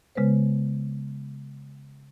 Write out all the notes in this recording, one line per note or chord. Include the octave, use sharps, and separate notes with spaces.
C#3 G#3 B3 B4 C5